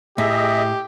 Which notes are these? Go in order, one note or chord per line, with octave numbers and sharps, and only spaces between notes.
A2 G4 G#4 D#5 E5